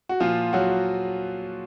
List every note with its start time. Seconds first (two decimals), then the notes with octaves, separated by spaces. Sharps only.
0.09 F#4
0.20 A#2 F3 F4
0.53 F#3 F#4